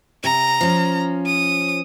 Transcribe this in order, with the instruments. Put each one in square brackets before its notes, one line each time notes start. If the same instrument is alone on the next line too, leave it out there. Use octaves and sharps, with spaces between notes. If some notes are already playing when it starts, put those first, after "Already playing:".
[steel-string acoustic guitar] C3 [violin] A#5
[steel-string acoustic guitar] F3 C#4
[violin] D#6